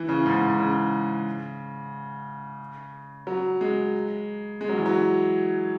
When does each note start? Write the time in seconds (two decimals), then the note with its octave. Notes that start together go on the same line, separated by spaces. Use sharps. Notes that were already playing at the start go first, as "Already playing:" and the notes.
Already playing: E3
0.09 C#3
0.26 G#2
0.42 G#2
0.59 C#3
3.27 F#3
3.61 G#3
4.61 G#3
4.69 F#3
4.78 E3
4.86 F#3